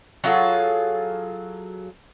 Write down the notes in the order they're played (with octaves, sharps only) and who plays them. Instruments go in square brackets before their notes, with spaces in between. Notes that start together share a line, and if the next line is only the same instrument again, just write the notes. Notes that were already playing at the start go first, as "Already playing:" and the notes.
[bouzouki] F#3 F4 G#4 A4